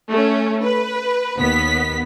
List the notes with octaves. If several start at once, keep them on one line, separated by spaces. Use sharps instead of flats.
A3 C#4
B4
D#2 B3 B6